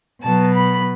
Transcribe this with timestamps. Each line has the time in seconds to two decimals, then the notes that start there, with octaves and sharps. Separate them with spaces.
0.23 B2 F#3 B3 A5
0.54 B5